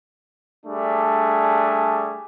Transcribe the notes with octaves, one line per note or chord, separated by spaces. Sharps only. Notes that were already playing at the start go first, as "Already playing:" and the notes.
G3 A3 D4 G#4